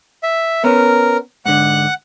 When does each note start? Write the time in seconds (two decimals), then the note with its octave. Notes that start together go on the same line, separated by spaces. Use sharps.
0.23 E5
0.64 B3 C#4 A#4
1.46 G#2 D3 F#5 F#6